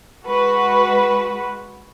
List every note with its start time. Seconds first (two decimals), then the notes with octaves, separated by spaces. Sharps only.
0.25 G#3 F#4 B4